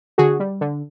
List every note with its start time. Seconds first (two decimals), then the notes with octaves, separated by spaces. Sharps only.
0.18 D3 F#4 G#4
0.40 G3
0.61 D3